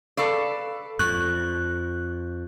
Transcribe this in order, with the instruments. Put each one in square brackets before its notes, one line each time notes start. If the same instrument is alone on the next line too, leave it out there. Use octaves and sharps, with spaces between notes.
[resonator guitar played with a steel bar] A4 B4 D5 [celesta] F5 C#6 C7
[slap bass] F2 [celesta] C#6 [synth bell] F#6